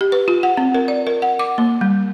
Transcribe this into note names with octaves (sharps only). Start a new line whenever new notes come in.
G4
B4
F4
F#5
C4
A#4
D5
A#4
F#5
D6
A#3
G3